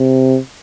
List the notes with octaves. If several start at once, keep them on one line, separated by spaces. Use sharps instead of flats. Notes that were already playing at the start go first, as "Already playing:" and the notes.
Already playing: C3